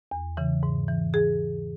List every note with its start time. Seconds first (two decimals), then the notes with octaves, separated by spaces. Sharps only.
0.11 E2
0.37 C#3 E3
0.63 G#2
0.88 E3
1.14 G#4